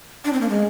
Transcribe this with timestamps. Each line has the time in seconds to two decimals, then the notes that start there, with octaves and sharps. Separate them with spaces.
0.25 D4
0.33 C4
0.41 A#3
0.49 G#3